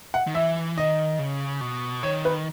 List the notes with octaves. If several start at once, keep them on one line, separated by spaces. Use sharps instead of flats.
F#5
D#3
E3 E5
D#3 D#5
C#3
B2
D#3 C#5
B4